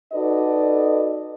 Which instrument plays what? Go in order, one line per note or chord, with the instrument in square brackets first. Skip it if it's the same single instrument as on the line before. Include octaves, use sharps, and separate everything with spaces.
[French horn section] D#4 F#4 A4 B4 D5 D#5